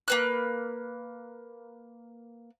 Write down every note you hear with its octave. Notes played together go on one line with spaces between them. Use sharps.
A#3 B4 F#6